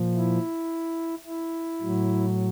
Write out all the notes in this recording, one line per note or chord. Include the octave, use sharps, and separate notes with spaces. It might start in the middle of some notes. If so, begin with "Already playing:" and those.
Already playing: A#2 F3
E4
E4
A2 F#3